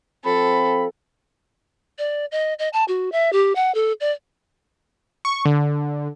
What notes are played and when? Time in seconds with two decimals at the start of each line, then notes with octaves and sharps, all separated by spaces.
0.24 F3 C4 A4 B5
1.98 D5
2.32 D#5
2.59 D#5
2.73 A5
2.88 F#4
3.12 E5
3.33 G4
3.55 F#5
3.74 A4
4.00 D5
5.25 C#6
5.45 D3